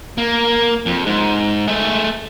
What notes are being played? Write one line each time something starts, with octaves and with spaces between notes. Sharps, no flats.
A#3
F2
G#2
A3 G#4